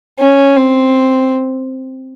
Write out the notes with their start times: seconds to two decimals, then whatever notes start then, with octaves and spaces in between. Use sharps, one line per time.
0.19 C#4
0.56 C4